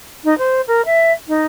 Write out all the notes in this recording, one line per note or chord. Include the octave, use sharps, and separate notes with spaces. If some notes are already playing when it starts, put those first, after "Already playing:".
D#4
C5
A#4
E5
D#4